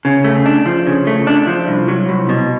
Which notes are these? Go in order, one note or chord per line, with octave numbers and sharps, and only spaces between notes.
C#3
A3
D4
F3
C#3
A3
D4
F3
C2
F#3
C2
B2